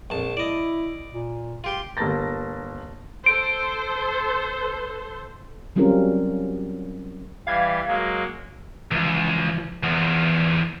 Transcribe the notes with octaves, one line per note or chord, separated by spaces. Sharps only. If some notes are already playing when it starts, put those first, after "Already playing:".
A#1 F2 A5
E4 D5 D#5
A#2
F4 G4 C6
G1 A#3 A#4 A5 A6 A#6
A4 C5 D7
F#3 G3 C4 C#4 F4 A#4
E3 G3 F5 G#6
F#3 G#3 A#3
C#2 E3 F3
E2 E3 F3 F#5